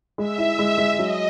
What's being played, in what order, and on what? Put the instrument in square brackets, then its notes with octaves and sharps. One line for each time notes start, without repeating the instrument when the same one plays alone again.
[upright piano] G#3 [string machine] E5
[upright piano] E4
G#3
G#3
[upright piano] F#3 [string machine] D#5